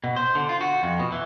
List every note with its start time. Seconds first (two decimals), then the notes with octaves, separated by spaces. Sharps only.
0.04 B2
0.16 C5
0.35 D3
0.49 F4
0.61 F#4
0.83 F2
0.99 B2
1.12 E3